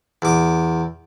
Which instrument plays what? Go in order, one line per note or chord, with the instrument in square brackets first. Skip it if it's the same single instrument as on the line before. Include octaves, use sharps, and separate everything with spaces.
[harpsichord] E2 D6